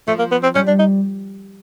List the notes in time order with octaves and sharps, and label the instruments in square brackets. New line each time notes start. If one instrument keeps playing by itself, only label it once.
[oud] F3 [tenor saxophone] A3
[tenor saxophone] A#3
B3
C4
[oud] G3 [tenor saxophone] C#4
[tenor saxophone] D4
D#4